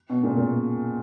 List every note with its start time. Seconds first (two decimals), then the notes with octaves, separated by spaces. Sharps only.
0.10 B2
0.23 A#2 C#3
0.37 A#2